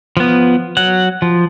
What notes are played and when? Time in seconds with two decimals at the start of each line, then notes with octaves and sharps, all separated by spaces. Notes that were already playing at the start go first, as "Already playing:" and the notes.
0.17 F3 B3
0.77 F#3 F#5
1.22 F3